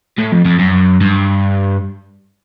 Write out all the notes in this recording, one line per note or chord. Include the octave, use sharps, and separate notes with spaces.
A2
F2
F2
F#2
G2